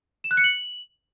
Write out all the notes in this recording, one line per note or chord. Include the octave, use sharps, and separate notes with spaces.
E7
F#6
C#7
F#7